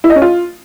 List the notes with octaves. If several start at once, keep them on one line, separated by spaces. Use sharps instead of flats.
E4
D#5
C#4
F4